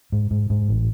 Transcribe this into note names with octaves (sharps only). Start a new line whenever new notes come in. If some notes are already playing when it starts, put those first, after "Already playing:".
G#2
G#2
G#2
A1